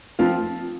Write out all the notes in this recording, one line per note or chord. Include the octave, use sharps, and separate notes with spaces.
F3 C4 F4